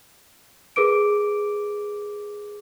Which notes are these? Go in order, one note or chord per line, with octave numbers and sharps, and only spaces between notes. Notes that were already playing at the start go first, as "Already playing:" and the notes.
G#4 A#4 B4 D6 D7